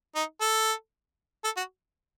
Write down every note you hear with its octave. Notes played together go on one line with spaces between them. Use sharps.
D#4
A4
A4
F#4